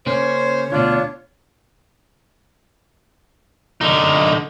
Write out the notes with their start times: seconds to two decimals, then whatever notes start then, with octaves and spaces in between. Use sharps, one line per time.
0.07 C#3 A#3 C#4 C5 C#5
0.72 D2 B2 D4 F4
3.81 D3 D#4